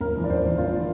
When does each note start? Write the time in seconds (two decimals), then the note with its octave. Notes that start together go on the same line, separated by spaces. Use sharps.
0.01 G1 A#4
0.16 F2 E3
0.24 D5
0.30 G1 C5
0.44 F2 E3 A#4
0.58 G1 F4
0.76 E3